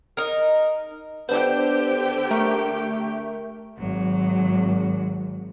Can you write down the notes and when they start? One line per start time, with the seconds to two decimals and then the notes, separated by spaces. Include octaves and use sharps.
0.17 D#4 A#4
1.29 D3 B3 D4 G4 C5 G5
2.31 A3 A#4 C#6
3.78 G#1 F#3